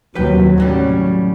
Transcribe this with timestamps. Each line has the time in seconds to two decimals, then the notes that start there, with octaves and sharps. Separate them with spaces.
0.15 D#2 C3 F#3 B4 G5
0.58 A2 F#3 G3 C#4